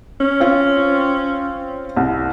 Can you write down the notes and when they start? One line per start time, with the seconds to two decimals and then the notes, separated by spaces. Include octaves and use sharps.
0.20 C#4
0.40 C4 F4
1.97 C2